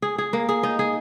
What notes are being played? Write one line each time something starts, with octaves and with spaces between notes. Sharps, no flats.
G#4
G#4
A#3
G#4
D#4
G#4